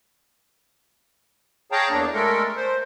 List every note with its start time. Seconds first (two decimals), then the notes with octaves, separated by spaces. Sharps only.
1.72 G#4 C#5 F5 G5 A5 A#5
1.90 E2 A#3 D4
2.14 G#3 A3 A4 A#4
2.57 C5